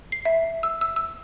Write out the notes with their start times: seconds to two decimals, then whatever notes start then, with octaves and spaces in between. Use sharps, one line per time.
0.12 C7
0.25 E5
0.63 E6
0.81 E6
0.96 E6